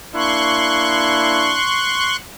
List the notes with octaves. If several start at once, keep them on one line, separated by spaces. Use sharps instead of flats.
A#3 D4 E4 C6 C#6 F#6